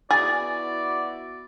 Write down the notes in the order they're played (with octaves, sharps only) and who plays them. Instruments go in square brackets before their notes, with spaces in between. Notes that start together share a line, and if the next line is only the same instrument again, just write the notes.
[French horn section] B3 E4 F#4 [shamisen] G#4 [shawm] D5 [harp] A6